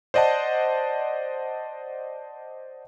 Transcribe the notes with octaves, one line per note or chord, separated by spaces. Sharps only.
C5 D5 D#5 F#5 A5